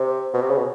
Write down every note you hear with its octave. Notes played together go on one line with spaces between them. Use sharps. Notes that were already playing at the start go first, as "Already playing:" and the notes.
Already playing: C3
B2
C3
C#3
B2